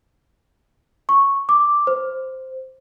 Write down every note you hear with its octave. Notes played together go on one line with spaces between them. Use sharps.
C#6
D6
C5